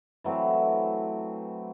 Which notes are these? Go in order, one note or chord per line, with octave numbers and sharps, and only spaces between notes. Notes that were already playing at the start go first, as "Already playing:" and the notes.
E3 F#3 A3 C4